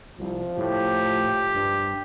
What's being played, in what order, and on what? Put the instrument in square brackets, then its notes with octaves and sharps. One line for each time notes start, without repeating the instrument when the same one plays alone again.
[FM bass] C2 [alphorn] F3
[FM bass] A2 [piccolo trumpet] G4
[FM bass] G2